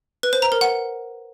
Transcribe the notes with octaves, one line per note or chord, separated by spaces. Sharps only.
B4
C5
A#5
A#4
F#5